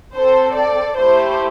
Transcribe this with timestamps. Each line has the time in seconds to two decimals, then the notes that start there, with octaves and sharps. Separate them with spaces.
0.15 C4 A4 C5
0.57 D5
0.99 A3 E4 G4 C5